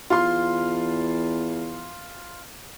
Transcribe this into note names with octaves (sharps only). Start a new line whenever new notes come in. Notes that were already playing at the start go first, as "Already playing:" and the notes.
E2 F4 C6